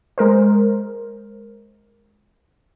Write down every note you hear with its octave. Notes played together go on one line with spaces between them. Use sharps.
G#3 A#4 C5